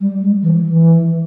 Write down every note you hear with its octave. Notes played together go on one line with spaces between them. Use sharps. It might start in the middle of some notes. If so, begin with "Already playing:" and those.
G3
G#3
E3
E3